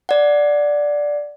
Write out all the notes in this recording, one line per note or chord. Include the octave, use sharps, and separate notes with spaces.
D5 F#5